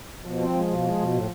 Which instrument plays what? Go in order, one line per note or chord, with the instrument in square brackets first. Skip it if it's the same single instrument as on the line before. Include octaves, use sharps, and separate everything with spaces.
[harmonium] B2 [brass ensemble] F3
[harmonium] C4
G#3
B2
G#3
B2
A2